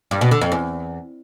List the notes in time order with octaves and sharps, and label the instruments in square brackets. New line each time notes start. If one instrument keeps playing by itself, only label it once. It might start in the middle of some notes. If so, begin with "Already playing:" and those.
[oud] G2
B2
D3
F2
E2